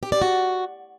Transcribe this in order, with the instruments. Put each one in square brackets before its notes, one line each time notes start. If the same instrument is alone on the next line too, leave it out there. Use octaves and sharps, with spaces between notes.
[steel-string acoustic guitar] G4
D5
F#4